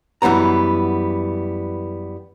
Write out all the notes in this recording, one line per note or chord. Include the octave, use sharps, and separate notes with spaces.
F#2 E3 G3 B3 A#5